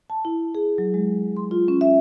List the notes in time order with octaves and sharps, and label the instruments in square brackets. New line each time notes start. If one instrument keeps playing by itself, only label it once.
[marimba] A5
E4
G#4
F#3
G#3
C6
F4
C#4
E5